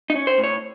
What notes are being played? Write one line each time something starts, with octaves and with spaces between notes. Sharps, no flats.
D#4
C#4
C5
A2
C#5